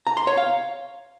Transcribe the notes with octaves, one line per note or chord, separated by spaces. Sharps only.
A#5
C6
C#5
F5